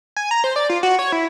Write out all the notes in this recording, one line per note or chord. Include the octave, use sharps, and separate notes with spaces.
G#5
A#5
C5
D5
F4
F#4
C#5
E4